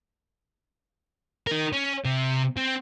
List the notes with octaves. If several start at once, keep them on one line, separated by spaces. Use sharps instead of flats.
D#4 A#4
C#4
C3
C4